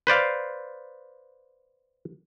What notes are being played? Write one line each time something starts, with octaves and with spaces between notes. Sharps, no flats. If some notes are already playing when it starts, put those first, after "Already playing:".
B4 C5 D5 F5